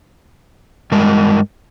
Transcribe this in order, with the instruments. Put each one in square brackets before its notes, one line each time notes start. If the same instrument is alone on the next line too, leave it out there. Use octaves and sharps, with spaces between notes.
[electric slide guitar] G2 G#3 A#4